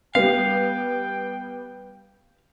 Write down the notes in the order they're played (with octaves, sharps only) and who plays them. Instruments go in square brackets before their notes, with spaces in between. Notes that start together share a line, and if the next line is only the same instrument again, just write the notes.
[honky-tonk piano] G3 B3 [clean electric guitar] F5 [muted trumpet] G5